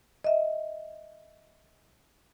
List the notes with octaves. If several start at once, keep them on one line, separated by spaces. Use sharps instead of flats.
D#5 E5